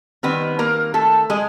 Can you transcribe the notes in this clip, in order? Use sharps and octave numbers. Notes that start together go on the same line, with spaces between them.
D#3 G3 B3 C4 B4
A#3 A#4
A3 A4
G#3 G#4